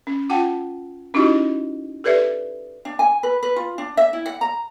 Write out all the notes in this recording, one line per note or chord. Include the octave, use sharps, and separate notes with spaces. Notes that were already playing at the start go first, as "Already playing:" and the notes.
C#4
F4 F#5 G5 A5
C#4 D#4 E4 F#4 G4 D#5
G4 A4 B4 D5 E5
D4
G#5
B4
B4
F4
D4
E5
E4
F#5
A#5